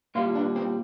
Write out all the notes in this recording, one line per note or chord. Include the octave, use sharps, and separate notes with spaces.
A#2 G3 F4
D4
C4